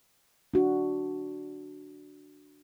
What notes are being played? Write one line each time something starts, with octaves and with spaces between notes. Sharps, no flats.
D4 F#4